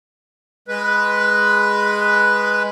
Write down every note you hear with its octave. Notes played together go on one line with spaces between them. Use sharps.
G#3 B4